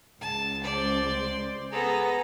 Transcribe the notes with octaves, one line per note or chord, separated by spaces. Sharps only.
C#2 A5
C5 D5
B3 G#4 A4 A#5